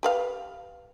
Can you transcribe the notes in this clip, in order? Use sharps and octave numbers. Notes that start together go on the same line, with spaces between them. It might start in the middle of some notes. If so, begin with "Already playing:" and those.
G4 B4 F5